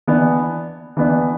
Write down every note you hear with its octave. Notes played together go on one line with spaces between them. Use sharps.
E3 B3 D4
E3 B3 D4